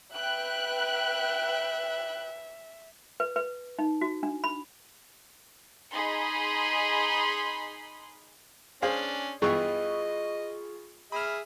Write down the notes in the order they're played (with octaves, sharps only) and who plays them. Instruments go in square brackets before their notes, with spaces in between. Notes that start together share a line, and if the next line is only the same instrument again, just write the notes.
[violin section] B4 G5 F#6 [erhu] E5
[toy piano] B4
B4
D#4
F#4
D4
B5
[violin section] D#4 G#4 B5 C6
[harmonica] C#4 D4 [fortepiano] G#4 C5 F5
[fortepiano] G2 E3 B3 [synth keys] F4 G#4 C#6 [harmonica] D#5
[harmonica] G#4 E5 [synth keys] B5 F6